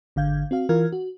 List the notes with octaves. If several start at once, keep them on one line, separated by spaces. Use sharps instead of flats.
G#1 D3 F5 G6 G#6
C4 F#4 F5
E3 F4 A#4 F5 F6 G#6
F#4